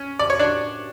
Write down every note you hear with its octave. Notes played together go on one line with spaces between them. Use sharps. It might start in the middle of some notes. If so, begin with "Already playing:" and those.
Already playing: C#4
D5
C#5
D4 D5